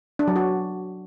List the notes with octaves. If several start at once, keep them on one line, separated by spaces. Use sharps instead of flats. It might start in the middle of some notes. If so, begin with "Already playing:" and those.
D4
F#3
F#4